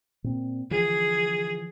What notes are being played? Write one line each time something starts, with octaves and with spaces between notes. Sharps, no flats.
A#2 C4
D3 E3 F3 G#4